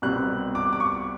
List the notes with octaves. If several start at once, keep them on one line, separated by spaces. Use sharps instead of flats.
C2 B2 G3 C4 F#6
D6
D6
C#6